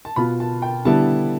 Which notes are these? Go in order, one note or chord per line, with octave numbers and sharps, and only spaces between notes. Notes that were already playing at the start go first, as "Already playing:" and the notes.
A5
B2 B3 F4 B5
A5
G5
D3 G3 B3 E4 A5